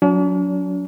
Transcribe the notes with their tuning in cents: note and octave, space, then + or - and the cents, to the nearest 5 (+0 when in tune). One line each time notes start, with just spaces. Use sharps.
F#3 -15 D4 -45